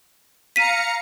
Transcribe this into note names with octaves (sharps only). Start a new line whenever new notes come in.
F5 A#5 B6 C#7 D#7